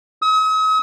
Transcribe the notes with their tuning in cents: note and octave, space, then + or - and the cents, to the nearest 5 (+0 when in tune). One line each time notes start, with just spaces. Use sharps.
D#6 +45